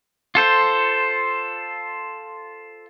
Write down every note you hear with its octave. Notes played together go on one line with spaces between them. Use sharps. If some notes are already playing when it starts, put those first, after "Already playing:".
F4 A4 C5